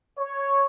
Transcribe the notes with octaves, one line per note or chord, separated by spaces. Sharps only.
C#5